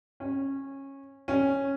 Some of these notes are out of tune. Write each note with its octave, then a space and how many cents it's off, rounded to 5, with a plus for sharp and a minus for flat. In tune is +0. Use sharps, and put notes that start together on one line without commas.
C#4 -20
C#4 -10